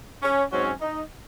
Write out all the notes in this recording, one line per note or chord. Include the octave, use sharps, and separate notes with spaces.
C#4
G#2 F#3 C4 C#4
D#4